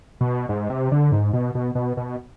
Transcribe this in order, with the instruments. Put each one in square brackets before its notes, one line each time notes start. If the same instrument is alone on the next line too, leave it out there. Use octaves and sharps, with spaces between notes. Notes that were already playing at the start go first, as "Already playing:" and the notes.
[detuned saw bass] B2
G#2
C3
D3
G#2
B2
B2
B2
B2